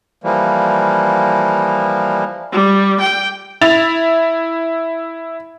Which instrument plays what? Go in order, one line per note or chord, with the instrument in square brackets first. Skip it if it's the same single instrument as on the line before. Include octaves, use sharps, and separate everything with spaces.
[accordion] E3 F3 G3 A#3
[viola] G3
G5
[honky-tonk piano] E4 A6 F7